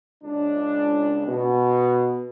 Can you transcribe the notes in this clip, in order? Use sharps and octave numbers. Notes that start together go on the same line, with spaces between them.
C#2 D4
B2